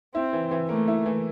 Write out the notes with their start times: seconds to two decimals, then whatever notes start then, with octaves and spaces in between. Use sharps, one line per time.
0.15 C4 E4
0.33 E3
0.51 E3
0.69 A3 A#3
0.88 E4
1.06 E3